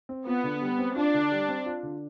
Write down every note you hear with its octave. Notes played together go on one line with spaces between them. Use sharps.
C4
B3 F4
D3
G3
C4
D4 F4
D3
G3
C4
F4
D3